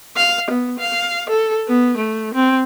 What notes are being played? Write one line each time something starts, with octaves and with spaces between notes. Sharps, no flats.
F5
B3
F5
A4
B3
A3
C4